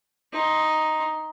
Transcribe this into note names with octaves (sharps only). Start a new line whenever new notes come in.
D#4 C6